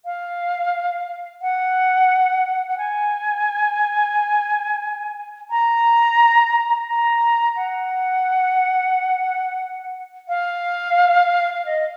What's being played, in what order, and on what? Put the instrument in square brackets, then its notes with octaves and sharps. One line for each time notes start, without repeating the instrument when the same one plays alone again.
[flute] F5
F#5
F#5
G#5
A#5
A#5
F#5
F5
F5
D#5